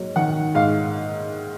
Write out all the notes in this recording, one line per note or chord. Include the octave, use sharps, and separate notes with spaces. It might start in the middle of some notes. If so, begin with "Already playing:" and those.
Already playing: G#2 F#3 A#3
D#3 F#5
G#2 F5